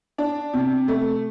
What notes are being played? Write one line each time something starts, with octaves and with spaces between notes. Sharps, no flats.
D4
C3
A3